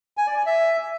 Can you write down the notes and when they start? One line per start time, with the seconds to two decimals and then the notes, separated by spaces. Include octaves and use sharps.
0.17 G#5
0.27 D5
0.36 G#5
0.46 E5